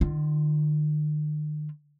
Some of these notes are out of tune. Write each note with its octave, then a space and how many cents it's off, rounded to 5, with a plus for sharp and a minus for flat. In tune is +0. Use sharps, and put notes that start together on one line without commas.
D#3 -45 F4 -20